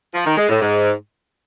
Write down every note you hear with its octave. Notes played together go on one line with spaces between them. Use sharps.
F3
D#3
G#3
A2
G#2